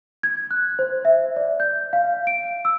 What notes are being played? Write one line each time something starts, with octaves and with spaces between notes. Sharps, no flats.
G#6
F#6
C5
E5
D5
G6
F5
D7
E6